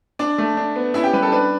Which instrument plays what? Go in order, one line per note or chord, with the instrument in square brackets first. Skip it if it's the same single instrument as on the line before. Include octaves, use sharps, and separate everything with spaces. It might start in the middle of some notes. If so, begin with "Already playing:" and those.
[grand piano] D4 D5
A3
D4
B3
C#4 E4 E5
G4 G5
G3 B4
A4
D4 B4